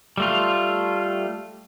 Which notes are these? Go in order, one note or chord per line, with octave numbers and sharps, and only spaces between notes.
G3 A3 F4